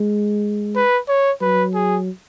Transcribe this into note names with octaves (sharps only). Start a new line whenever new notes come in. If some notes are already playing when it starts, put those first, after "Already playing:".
Already playing: G#3
B4
C#5
F#3 B4
G#4